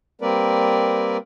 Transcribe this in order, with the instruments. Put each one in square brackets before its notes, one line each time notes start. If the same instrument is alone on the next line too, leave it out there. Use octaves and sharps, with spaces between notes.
[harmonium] G3 A#3 C4 A#4 B4 D5